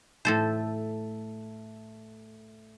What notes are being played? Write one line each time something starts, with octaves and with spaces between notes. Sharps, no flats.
A2 A3 A4 C5